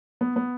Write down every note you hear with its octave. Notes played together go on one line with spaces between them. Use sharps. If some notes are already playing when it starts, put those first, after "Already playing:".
B3
B3